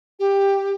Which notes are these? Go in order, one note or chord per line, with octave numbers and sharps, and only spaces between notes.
G4